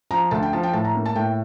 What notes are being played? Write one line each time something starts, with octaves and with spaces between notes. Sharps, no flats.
F3 A#5
D2 A5
G5
F3 A5
G5
A2 A5
A#5
A#3
A5
A2 G5